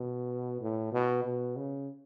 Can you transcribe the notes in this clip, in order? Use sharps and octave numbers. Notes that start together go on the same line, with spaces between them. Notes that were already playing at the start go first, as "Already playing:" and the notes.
Already playing: B2
A2
B2
B2
C#3